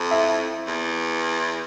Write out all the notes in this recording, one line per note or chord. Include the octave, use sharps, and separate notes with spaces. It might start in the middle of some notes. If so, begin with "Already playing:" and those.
Already playing: F2
E4 E5
E2